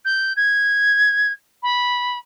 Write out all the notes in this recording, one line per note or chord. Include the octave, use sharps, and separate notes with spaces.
G6
G#6
B5